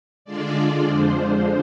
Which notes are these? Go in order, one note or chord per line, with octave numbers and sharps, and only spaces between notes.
D3 G#3 D4 F4 D5
F2 D3 G#3 D4 F4 C5